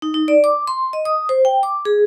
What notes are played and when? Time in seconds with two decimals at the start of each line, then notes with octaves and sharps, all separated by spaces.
0.02 D#4
0.14 D#4
0.28 D5
0.44 D6
0.67 C6
0.93 D#5
1.05 D#6
1.29 C5
1.45 G5
1.63 D6
1.85 G#4